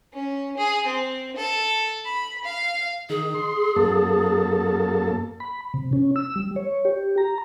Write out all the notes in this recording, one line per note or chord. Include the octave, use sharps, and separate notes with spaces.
C#4
G#4
C4
A4
B5
F5
D#3 G#4
C6
F#2 A#3 A4
B5
C3
C#4
E6
G3
C#5
G4
A#5